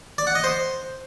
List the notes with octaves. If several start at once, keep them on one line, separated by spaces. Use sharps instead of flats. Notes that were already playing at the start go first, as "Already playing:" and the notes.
D5
F#5
D#5
C5